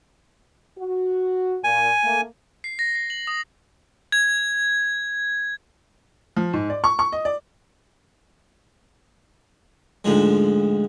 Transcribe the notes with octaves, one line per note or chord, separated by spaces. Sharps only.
F#4
A#2 G#5
A3 A#3
C7
A#6
C7
F#7
D#6
G#6
F3
G#2
D5
C#6
C#6
D#5
D5
D2 G#2 F3 G#3